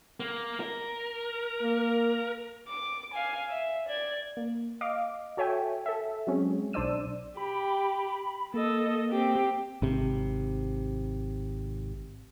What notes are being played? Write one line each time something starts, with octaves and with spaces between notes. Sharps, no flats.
A#3
A#4
A#3
D6
F5 G#5
E5
D5 G#6
A#3
D#5 F5 D6
F#4 A4 C#5 E5 G5 G#5
A4 E5
F#3 G#3 C4 C#4 G#4
B1 D4 C5 D5 E6 D#7
G4 B5
A#3 A4 D#5
C4 G4
G#1 C3